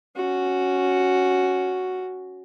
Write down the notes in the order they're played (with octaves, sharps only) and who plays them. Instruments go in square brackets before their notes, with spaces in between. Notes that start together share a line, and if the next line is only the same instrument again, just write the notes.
[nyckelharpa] C#4 F#4